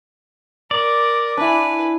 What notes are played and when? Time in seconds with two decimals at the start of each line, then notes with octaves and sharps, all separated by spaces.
0.71 A#4 D5
1.37 D4 E4 B4 G#5